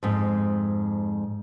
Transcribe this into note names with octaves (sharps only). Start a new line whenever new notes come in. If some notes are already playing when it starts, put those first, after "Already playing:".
F2 G#2